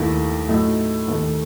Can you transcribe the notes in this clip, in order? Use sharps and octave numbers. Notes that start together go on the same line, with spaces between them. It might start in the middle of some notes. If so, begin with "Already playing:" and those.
Already playing: D#2 D#3 A3 E4
A2 F#3 A3 D#4
D#2 D#3 A3